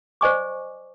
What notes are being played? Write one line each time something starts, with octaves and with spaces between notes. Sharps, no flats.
C5 D5 D#5 G#5 C#6 D6